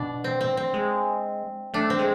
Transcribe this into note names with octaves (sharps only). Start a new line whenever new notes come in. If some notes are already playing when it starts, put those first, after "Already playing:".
Already playing: B2 D4
C4
C4
C4
G#3
A3 D4
C4
G#3